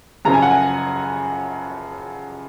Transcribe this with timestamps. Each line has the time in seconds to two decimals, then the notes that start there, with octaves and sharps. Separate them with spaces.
0.25 F#2 C#3 F3 A#5
0.34 G#5
0.42 F#5
0.51 G#5